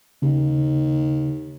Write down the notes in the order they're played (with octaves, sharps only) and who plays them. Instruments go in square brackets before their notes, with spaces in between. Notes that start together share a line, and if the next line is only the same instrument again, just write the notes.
[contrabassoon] D#2 [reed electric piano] C#3